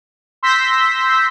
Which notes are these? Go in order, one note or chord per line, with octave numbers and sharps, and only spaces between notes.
C6 E6 G6 A#6 B6